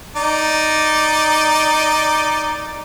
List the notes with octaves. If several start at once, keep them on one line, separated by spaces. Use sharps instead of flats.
D#4 D5